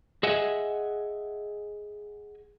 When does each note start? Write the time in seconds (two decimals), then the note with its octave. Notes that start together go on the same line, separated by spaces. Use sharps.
0.23 G#4 D#5 E5 F#5 G#5